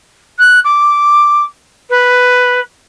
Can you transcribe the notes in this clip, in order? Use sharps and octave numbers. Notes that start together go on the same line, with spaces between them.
F#6
D6
B4